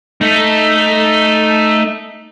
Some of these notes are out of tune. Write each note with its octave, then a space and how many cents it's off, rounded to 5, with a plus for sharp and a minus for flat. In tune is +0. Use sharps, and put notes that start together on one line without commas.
A3 +0 D#4 +0